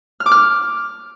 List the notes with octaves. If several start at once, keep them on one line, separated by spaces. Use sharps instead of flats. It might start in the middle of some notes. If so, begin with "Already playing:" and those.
F6
D6
F6